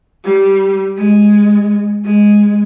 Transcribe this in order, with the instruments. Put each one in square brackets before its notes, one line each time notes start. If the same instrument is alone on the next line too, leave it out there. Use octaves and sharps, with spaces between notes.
[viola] G3
G#3
G#3